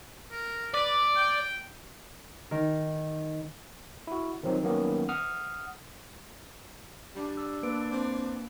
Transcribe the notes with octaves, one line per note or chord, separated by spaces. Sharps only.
A#4
B4 D5
G5
D#3
E4 F#4
D#3 F3 F#3 C4 D#4
D#3 F#3 G3 A#3 B3 C#4
F#5 D#6 F6
G3 D4
E6
A#3 B4 D7
C4